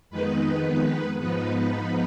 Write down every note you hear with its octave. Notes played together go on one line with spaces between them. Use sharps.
F2 D#3 G#3 B3 D#4 B4
G#2 F3 B3 D#4 B4